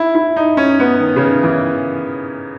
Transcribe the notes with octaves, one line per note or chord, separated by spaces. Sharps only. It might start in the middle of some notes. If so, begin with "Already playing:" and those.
Already playing: E4
E4
D#4
C#4
B3
D#3
C#3
D#3
E3